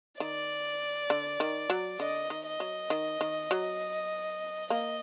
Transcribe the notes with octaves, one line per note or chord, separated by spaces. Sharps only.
D#3 D5
D3
D#3
F#3
D3 D#5
D#3
D#5
F#3
D#3
D#3
F#3
A#3 D#5